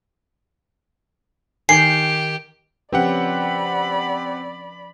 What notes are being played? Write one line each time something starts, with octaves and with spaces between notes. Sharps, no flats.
D#3 G4 G#5 C7
F3 C4 C#4 G4 B4 D5 F#5 B5